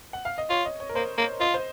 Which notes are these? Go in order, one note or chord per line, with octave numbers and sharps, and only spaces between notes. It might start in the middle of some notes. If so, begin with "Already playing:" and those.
F#5
F5
D#5
F4 C#5
D#5
C#5
A#4
A#3 C5
A#3 C#5
F4 D#5
C5